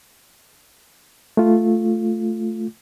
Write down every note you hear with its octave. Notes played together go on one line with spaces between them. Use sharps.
A3 F4